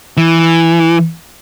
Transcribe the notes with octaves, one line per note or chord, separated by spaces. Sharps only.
E3